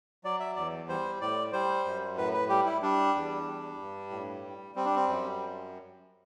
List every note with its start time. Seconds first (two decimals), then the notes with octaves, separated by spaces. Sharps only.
0.24 F#3 D5
0.40 E5
0.56 E2 D5
0.89 G3 C5
1.21 A2 D5
1.53 G3 C5
1.85 F#2
2.17 A2 B4
2.33 B4
2.49 G3 G4
2.66 E4
2.82 G3 D4
3.15 E2
3.47 G3
3.79 G2
4.10 A2
4.44 G3
4.75 G3 C4
4.85 D4
4.96 C4
5.08 F#2